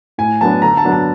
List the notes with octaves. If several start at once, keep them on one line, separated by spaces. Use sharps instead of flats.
A2 G#5
F#3 B3 D4 A5
D3 A#5
A5
F#3 B3 D4
A5